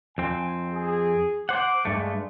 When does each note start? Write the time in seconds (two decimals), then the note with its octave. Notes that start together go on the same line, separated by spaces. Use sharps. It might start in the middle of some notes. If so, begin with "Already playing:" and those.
0.18 F2 C4 G#5
0.74 G#4
1.49 C5 F#5 D6
1.85 G2 G#3 A3